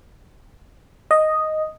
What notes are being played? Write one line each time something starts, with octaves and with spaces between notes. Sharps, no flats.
D#5